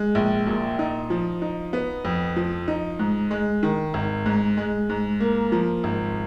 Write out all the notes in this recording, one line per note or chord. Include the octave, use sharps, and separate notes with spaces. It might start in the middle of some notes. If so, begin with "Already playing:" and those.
Already playing: G#3
A#1
A#2
D#4
F3
D#4
B3
F2
F3
D#4
G#2
G#3
D#3
G#1
G#2
G#3
G#2
A#3
F3
G#1